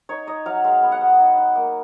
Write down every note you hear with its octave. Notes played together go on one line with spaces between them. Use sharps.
D#4 C#5
D#4 D#5
F#3 F5
G#3 F5
B3
F#5
B3
D#4
D#4
A#3